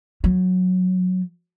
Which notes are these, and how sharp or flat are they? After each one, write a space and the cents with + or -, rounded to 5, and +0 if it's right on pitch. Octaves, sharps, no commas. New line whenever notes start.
F#3 -15